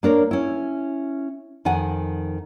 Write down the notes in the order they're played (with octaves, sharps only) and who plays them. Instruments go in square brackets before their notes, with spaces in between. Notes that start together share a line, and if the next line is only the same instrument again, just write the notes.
[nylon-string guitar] A#3 D4 A#4 C#5
C#4 E4
F2 D#3 F#5 G#5